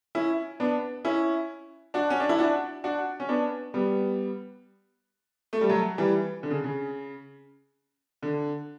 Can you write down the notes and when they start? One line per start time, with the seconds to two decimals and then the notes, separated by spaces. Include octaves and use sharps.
0.15 C#4 E4
0.60 B3 D4
1.05 C#4 E4
1.94 D4 F#4
2.10 C#4
2.20 D4
2.29 E4
2.39 D4 F#4
2.84 D4 F#4
3.20 C#4
3.29 B3 D4
3.74 G3 B3
5.53 A3
5.61 G3
5.69 F#3 A3
5.98 E3 G3
6.43 D3
6.50 C#3
6.64 C#3
8.23 D3